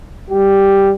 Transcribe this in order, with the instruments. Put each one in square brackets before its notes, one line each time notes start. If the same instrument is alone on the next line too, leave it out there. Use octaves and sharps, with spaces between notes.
[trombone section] G3 G4